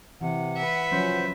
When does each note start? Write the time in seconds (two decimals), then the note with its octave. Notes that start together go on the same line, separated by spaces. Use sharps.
0.21 C3 E3 F#5
0.57 B4 E5
0.91 F3 F#3 C#4 C5